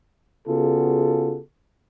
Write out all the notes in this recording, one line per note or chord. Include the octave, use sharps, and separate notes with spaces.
C#3 B3 F4 F#4 G#4 A4